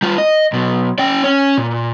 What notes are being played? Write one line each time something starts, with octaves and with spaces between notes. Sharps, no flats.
G3 F4
D#5
B1 B2
C#4 G5
C#4 C#5
A#2